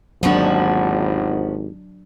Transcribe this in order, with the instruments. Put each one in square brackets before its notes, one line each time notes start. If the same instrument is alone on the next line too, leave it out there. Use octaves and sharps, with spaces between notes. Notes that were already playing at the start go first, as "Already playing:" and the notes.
[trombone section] G#1 D#2 [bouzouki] F3 B3 F#4 [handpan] F#3 D4